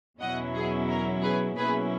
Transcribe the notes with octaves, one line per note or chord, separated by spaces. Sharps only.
E2 B2 F#3 C#4 E4 D#5 F#5
G#4
A#4
G#4 B4
B2 F#3 A#3 C#4 E4 G#4 B4